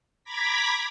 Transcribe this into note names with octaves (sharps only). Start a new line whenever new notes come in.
A#5 B5 D6 G#6 A#6 B6